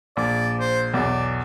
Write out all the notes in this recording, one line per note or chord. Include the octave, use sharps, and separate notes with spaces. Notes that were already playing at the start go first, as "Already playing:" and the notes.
A#1 D5
C5
B1 E2 D5